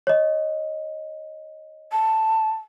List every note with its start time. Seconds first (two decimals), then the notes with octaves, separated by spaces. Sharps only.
0.07 C#5 D#5
1.92 A5